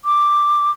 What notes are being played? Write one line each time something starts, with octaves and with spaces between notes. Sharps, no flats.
D6